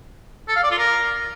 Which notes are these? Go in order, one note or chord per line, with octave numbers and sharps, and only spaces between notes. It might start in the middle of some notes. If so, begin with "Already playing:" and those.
A4
F5
D5
F4
A#4